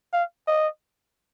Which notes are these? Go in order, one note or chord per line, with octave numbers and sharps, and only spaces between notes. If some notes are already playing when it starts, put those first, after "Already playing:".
F5
D#5